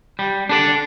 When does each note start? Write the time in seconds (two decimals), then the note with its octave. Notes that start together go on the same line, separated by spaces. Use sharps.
0.19 G3
0.49 D4 A4 D5